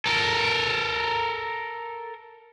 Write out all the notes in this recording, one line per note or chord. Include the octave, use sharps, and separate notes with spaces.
A4 A#4